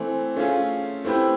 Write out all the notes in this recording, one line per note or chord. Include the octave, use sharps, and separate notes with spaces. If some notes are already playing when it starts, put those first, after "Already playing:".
Already playing: E3 A3 C4
A3 C#4 F4 G#4
A3 C4 E4 G4 B4